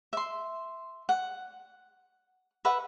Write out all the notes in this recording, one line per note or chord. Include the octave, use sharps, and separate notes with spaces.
E5 C6
F#5
B4 E5 F#5 B5